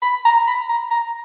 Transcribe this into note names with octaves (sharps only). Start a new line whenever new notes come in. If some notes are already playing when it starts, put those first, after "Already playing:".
B5
A#5
B5
A#5
A#5